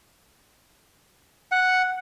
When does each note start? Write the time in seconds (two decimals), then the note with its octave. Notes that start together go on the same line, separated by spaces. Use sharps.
1.52 F#5